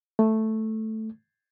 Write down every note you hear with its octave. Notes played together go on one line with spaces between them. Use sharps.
A3